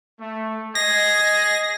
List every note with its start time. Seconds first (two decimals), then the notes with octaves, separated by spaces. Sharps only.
0.20 A3
0.75 G#4 D#5 A#6